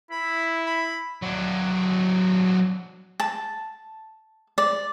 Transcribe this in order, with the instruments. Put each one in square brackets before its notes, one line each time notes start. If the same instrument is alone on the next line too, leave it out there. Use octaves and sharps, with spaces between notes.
[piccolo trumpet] E4 [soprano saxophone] B5
[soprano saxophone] B5
[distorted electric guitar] F#3 D4
[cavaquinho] A5
D5